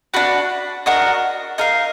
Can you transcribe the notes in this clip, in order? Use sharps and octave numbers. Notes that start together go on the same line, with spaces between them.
D4 F#4 B4
D4 F#4 A#4 D#5
D#4 A#4 F5